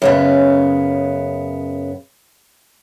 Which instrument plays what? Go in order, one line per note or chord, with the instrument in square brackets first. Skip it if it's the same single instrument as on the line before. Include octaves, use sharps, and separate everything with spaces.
[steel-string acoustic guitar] F#2 C#3 B3